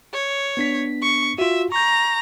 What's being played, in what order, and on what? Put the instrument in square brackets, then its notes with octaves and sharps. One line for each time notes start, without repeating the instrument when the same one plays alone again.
[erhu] C#5
[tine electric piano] B3 D4 B6
[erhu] C#6
[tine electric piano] F4 F#4 [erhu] E5
[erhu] A#5 [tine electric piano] C#6 G6